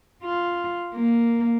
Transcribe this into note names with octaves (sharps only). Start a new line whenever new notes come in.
F4
A#3